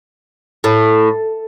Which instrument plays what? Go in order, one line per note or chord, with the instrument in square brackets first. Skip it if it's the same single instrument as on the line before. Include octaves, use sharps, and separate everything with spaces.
[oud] A2